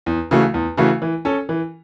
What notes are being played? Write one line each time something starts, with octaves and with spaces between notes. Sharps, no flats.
E2
C#3 E3 A3 F#4
E2
C#3 E3 A3 F#4
E3
C#4 A4
E3